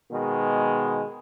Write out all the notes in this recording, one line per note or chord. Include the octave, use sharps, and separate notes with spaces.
B2 D#3 G#3